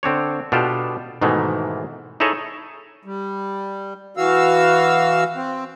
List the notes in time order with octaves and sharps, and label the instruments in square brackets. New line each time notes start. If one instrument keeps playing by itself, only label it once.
[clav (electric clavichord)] D3 C4 D4 C#5
B2 D4 F4 G4 A4
G#2 B2 D#3 E3 G#3 A3
D#4 E4 G#4 A4 C#5 D#5
[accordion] G3
E3 F#4 F5 E6
C4